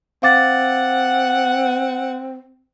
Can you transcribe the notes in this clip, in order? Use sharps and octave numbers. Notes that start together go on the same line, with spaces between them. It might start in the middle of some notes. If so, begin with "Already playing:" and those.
C4 F5 F#5 D6 A6